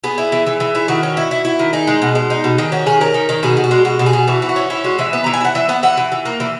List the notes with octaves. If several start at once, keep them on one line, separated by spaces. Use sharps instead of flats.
B3 G#4
E4
E3
E3
E3
E4
D#3 F#4
C#4
E4
E4
E4
D#3
D#4 G#4
G#3
B2
G#3
D#4
B2
D#3 G#4
C#4 F#4
D#3 G#4
C#4 A#4
D#3
D#3
B2 G#4
B2
F#4
G#3
B2 F#4
B2
G#4
B2
E3 F#4
E3
F#4
C#4
C#4 E4
G#3 F#4
E3 E5
B3
E3 A#5
G#5
E4 F#5
E3 E5
B3 F#5
E3 F#5
E3
E3
A#3
E3